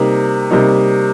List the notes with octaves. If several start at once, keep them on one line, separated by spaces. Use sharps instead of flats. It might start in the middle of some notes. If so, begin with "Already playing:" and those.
Already playing: C3 G3 A#3 D#4
C3 G3 A#3 D#4